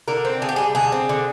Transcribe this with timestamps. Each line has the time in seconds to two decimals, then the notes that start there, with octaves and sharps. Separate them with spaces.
0.08 D3 A#4
0.25 C4
0.42 D3 G#4
0.49 G4
0.56 G3 G#4
0.75 D3 G#4
0.92 C4
1.09 D3